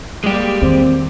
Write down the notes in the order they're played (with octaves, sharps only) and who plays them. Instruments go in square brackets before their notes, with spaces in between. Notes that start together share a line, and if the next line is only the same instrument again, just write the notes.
[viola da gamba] G3 A#3 [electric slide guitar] G#3 G4
[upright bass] E2 D#3 [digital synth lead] C4